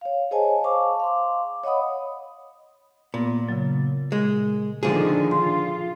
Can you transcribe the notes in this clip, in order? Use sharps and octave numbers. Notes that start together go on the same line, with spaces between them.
C#5 F5
G#4 C5 C#5 D#5 G#5 A5
C5 F5 A5 C#6 D6
F5 C6 D6
C#5 D#5 F#5 B5 D#6
A#2 B3
C#3 F#3
A#2 G#3
D3 D#3 F3 G#4
F4 C6